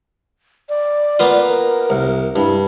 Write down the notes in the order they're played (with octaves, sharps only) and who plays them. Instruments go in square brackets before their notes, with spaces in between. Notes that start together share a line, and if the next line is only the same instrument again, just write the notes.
[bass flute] D5
[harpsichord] A#3 B3 F4
[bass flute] A#4
[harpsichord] C2
[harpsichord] G2 [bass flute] E4